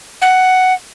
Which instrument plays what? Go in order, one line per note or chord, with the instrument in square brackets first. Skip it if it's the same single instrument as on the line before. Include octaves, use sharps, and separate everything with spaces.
[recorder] F#5